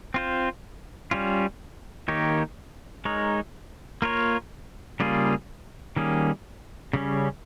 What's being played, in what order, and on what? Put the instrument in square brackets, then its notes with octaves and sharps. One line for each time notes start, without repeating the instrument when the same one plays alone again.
[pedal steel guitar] C4 F4 C5
G3 C#4 F4
D#3 A#3 D#4 G4 C#5
G#3 D#4 A#4 C#5
A#3 F4 A#4 C#5
C#3 G3 A#3 F4 G#4
D#3 G3 A#3 C#4 G#4
C#3 G3 C#4